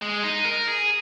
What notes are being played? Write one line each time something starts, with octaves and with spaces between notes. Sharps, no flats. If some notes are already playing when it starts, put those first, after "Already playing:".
G#3
D#4
A#4
G#4